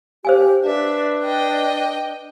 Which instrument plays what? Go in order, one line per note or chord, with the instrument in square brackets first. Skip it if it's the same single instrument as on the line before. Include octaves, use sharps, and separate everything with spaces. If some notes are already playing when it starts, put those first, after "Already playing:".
[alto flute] G4 [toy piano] C5 F5 G#5
[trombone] D4 [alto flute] B4 [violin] E5
[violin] D#5 G5